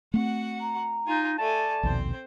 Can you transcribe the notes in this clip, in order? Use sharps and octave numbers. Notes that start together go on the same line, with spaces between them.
A3 C4 F#4 F#5
A#5
D#4 F4 G#5
A3 D5 G#5 A5
A#1 D#2 B2 C4 C5